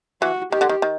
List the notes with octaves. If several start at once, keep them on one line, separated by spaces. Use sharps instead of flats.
E3 F#4
D#3 G4
D3
D#3
D#3